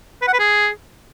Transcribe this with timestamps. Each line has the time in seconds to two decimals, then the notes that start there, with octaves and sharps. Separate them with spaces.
0.22 B4
0.28 F#5
0.33 B4
0.39 G#4